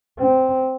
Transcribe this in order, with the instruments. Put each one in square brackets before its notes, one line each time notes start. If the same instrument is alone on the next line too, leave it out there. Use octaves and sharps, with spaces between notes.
[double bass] C4